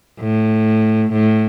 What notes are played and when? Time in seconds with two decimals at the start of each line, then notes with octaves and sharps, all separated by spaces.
0.20 A2
1.12 A2